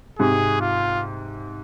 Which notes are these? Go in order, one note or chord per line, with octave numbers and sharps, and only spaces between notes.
G#2 C3 G#4
F4